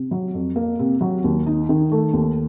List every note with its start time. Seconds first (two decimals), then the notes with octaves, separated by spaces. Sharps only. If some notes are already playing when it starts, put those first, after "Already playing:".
Already playing: C3
0.11 F#3
0.34 F2
0.56 A#3
0.79 C3
1.01 F#3
1.24 D#2
1.47 D#4
1.69 D#3
1.92 A3
2.13 D#2